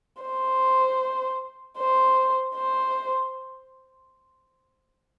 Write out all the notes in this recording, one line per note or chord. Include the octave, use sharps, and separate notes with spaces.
C5
C5
C5